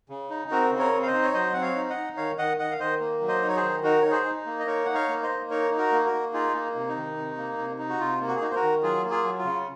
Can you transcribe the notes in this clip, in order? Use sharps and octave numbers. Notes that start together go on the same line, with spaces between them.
C#3
D#4
C4 F#4 A#4
C#3
A#4 C#5
C4
F5
C5 D#5
D#4
C#5
F#3 C5 D#5
C4 F#5
C#5 F5
D#4
D#5 F#5
D#4
D#3 C#5 F5
D#3 D#5 F#5
D#3 D#5 F#5
F5
D#3 C5 D#5
A#3
F#3
C5 D#5
D#4
C#5
G#4 C5
D#3
D#4 F#4 A#4
D#4 C#5
G#4 C5
D#4
A#3
D#5
D#4 A#4 C#5
D#4 F#5
C#5 F5
A#3
C5 D#5
A#3
D#4 A#4 C#5
D#4
F#4 A#4
A#3
F#4 A#4
A#3
D#4 F4 G#4
A#3
C3
D#4
D#3
C3
A#3
C3
D#4
F#4
C3 F4
A#3
F#4
G#4
D#4 F#4
C5
F#4 A#4
D#3
F#3 F4 G#4
A#3
F4 G#4
F#3
F4
C#3